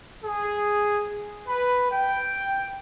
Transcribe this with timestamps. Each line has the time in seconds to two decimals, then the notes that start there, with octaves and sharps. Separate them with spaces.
0.24 G#4
1.47 B4
1.91 G5